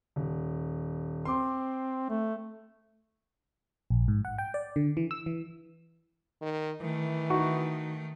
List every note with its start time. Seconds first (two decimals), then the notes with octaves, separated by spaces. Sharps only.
0.16 D#1
1.25 C4 C6 D6
2.10 A3
3.90 A#1
4.08 G#2
4.25 F#5
4.38 G5
4.54 D5
4.76 D3
4.97 E3
5.11 E6
5.26 E3
6.42 D#3
6.81 D#3 E3 A3
7.30 D#4 F#4 C#6